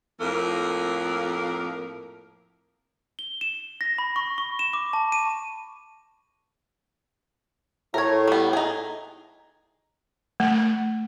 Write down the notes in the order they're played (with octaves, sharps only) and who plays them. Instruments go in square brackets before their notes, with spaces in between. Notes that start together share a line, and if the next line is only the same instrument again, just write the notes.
[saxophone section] F2 A2 A#3 A#4
[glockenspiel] G7
E7
A#6
B5
C#6
C#6
E7
D6
A5
D#7
[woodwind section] A2 [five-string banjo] A#4 C#5
[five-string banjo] G3 B3
D#4 G#4
[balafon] A3